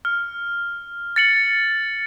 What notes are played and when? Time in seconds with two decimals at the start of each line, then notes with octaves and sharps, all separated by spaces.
0.05 F6
1.16 A6 C#7 F#7